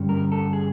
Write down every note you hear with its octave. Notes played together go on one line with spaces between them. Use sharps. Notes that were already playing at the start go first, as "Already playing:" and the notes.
Already playing: G2 D3 G3 C#4
A#4
A4
G#4